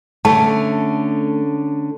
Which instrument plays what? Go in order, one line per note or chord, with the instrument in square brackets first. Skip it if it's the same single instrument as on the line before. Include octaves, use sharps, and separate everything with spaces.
[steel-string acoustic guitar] D3 C#4 [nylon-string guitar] A3 [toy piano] A5